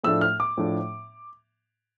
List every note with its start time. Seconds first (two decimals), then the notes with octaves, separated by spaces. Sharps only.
0.04 A2 F3 A3 D4 E6
0.21 F6
0.40 D6
0.57 A2 F3 A3 D4